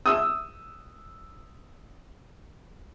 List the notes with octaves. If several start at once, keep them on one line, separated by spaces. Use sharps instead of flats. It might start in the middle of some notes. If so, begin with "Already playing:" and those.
D#6 E6